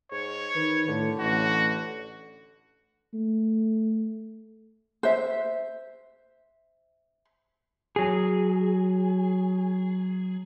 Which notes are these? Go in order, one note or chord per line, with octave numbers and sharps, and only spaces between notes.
G#2 C#5
D#3 B4
A2 D3
A1 F#4
A3
C5 E5
F#3 G#4